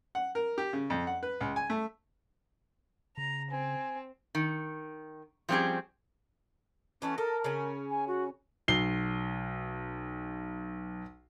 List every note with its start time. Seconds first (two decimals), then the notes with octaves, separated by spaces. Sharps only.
0.15 F#5
0.35 A#4
0.58 G4
0.73 C#3
0.90 F2
1.07 F#5
1.23 B4
1.41 C#2
1.56 G#5
1.70 A3
3.17 C#3 A#5
3.52 C4 G#5
4.35 D#3
5.49 F3 G3 C4 C#4 G4 G#4
7.02 E3 A3 B3 C#4
7.18 A4 A#4 D#5
7.44 C#3 C#4
7.90 G#5
8.07 F#4
8.68 B1 C7 G7